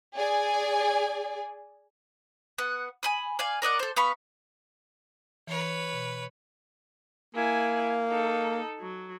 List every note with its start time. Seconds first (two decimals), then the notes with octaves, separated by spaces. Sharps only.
0.17 G#4 D5 G#5
2.58 B3 F#5
3.03 G#5 B5 D#6
3.39 D5 F5 G#5
3.62 A#4 D5 D#5 F#5
3.79 A4 C5
3.96 B3 F5 B5 C#6
5.47 E3 B4 C#5
5.93 B2
7.35 A#3 E4 G#5
8.08 D#4 A4
8.79 F#3